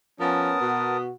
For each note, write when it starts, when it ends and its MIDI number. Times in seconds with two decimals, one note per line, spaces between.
0.20 0.52 53
0.20 0.97 59
0.20 0.58 61
0.20 0.97 70
0.20 0.97 81
0.20 1.00 87
0.61 1.11 47
0.61 1.14 66